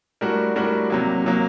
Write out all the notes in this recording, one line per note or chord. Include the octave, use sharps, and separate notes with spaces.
A2 G3 D4 F#4 A#4
A2 G3 D4 F#4 A#4
C3 F#3 A#3
C3 F#3 A#3